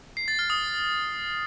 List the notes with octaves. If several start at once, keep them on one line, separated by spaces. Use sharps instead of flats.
C7
A6
F6
D#6